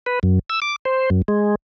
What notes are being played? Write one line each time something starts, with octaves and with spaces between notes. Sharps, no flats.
B4
F#2
E6
D6
C5
F#2
G#3